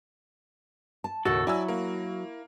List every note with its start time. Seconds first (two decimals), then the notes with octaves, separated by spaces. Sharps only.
1.04 A5
1.25 D#2 A2 C#3 F#4 A4
1.47 F#3 E4 D5 G#5 E6
1.68 A#3